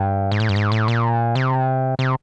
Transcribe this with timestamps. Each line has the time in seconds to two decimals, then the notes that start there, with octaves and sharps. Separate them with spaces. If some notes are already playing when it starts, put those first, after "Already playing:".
Already playing: G2
0.32 G#2
0.40 A2
0.49 G2
0.56 G#2
0.72 A2
0.88 A#2
1.35 C3
1.99 C3